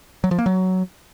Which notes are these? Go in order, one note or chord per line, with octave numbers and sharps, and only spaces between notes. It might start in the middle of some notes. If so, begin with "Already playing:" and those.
F#3
F3
A#3
F#3